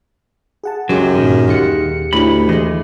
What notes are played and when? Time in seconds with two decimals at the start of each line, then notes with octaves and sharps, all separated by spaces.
0.64 G#4 F#5 A5
0.89 C#2 F#2 F#3 G#3 G4 C6
1.15 G2 A#2 D#3
1.47 D#2 G#3 F4 G4 F#5 C#7
2.13 D2 A2 D#3 D#4 B5
2.49 E3 G#3 D#5